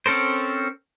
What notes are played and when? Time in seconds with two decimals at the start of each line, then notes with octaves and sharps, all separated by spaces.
0.06 C4 C#4 A4 A#4 C5